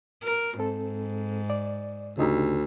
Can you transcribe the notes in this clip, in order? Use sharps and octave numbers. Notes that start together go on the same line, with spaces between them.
A#4
G#2 C4 A4
D5
D2 C#3 D#4 G4